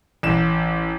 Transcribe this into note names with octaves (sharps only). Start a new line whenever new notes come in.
A1 E7